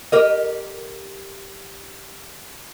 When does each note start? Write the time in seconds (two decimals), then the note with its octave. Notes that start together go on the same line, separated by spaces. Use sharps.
0.12 G4 A#4 D#5